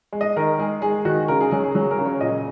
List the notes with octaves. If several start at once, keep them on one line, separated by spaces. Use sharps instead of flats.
G#3
D#5
D#3 A#4
G#3 G#4
G#3 G#4
D#3 F#4
C#3 A#4
G#4
F#3 G#4
G#4
F#3 G#4
A#4
C#3
C#5
A#2 D#5